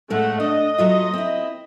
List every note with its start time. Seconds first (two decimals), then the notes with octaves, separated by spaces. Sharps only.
0.10 A2 G#3 A3 F#5
0.40 D4 D#5
0.78 F#3 A3 F4
1.14 C4 E4